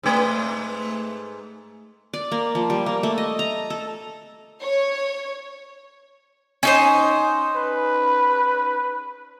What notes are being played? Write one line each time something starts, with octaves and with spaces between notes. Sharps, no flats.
G#2 A3 B4
D5
A#3
F3
G3
A#3
A3
D#5
A#5
A4
C#5
C#4 D#4 C5
B4